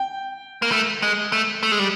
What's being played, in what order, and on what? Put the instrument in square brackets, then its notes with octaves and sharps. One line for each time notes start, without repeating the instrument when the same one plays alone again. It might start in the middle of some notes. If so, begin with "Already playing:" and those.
Already playing: [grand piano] G5
[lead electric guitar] A#3
A3
G#3
A3
A3
G#3
G3